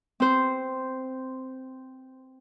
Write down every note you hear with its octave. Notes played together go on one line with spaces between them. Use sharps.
C4 C5